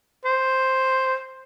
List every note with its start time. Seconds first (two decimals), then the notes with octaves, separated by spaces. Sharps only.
0.25 C5